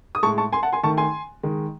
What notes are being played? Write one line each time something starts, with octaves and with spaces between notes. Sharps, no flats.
D#6
A2 G#3 A5 C#6
A5 C#6
G#5 C6
F#5 A5
G#5 C6
D#3 A3 A5 C#6
G#5 C6
D#3 G#3